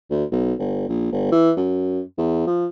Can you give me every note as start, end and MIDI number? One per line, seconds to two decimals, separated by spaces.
0.10 0.24 38
0.32 0.53 35
0.59 0.89 31
0.89 1.09 34
1.12 1.31 31
1.32 1.51 52
1.57 2.00 42
2.18 2.45 40
2.47 2.67 53